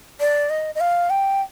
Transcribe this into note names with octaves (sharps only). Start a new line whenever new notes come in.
D5
D#5
D#5
F5
G5